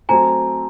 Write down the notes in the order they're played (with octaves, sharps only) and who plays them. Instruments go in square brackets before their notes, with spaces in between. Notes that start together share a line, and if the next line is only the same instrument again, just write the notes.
[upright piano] F#3 A3 C4 [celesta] G#5 A#5